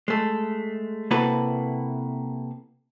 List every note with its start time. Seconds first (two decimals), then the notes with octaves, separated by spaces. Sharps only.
0.08 G#3 A3
1.11 C3 A#3 E4 F#4 A4 B4